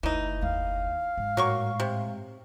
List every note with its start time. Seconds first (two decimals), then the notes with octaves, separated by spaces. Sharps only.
0.03 F#1 D2 E3 D#4
0.42 D#2 F5
1.18 G#2
1.37 A2 F#3 A#3 C#6
1.80 C3